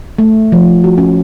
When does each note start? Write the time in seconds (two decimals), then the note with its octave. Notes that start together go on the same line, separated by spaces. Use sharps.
0.19 A3
0.52 F3
0.84 F#4
0.98 C#4